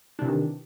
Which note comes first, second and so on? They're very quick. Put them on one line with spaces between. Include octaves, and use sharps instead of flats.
D4 C3 E3 D#3